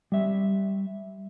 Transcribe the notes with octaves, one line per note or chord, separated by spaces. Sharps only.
G3 E5